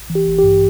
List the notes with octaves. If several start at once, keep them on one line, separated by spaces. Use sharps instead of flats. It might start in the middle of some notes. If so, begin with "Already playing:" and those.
Already playing: A1
E3
G4
A1
G4
G2